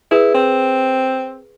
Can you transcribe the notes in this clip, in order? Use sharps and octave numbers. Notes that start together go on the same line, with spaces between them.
E4 G#4 B4
C4